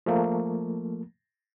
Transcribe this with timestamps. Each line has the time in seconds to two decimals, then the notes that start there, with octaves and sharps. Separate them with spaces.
0.06 F3 A3 A#3